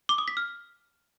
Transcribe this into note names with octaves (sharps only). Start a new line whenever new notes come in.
D6
D#6
B6
F6